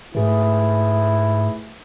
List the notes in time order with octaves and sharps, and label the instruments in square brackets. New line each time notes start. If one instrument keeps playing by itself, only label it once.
[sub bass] G#2 [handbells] A3 G#4 B4 [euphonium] E4